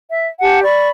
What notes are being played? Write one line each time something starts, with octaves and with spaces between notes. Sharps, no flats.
E5
G4 F#5 G#5 A5
D5 B5 C#6